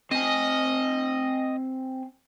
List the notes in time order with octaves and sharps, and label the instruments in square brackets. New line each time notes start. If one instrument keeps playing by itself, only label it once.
[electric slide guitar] C4 G#5 [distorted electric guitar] D#5